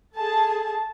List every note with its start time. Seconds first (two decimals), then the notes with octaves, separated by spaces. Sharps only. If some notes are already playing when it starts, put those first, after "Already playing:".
0.16 G#4 A4 A5